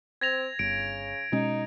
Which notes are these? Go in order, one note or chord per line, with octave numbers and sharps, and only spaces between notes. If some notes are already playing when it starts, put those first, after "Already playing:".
C4 G#6 A#6 F7
G1 C#3 D7
B2 G#3 C#4 D#4